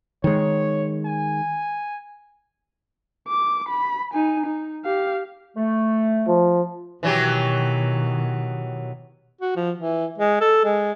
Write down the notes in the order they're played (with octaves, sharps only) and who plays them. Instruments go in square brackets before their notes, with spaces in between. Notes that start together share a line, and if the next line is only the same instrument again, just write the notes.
[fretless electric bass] D#3 G#3 [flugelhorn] C#5
[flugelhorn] G#5
[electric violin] D6
B5
D#4 G#5
D#4
G4 F5
[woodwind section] A3
[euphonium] F3
[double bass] B2 D#3 [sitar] E3 F#3 G4
[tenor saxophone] F#4
F3
E3
G#3
A4
G#3